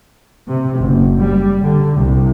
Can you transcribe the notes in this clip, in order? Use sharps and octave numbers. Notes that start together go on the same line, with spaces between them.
C3
F#1
G3
D3
C2